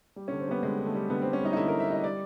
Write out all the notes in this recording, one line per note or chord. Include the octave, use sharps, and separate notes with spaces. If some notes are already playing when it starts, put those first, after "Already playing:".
G3
C#4
D3
C4
G3 B3
D3 G#3
D3
A3
G3
D3 B3
C4
G3
C#4
G3 D#4
D#4
D3 E4
A#4
G3
E5
G3 D#5
G3 D5